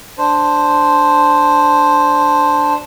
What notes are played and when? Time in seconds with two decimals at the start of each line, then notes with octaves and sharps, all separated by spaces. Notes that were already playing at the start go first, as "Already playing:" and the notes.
0.18 D4 C5